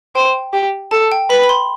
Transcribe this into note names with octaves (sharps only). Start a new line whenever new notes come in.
C5 G5
G4
A4 A5
G5
B4 B5
B5
C6